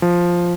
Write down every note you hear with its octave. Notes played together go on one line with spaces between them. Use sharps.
F3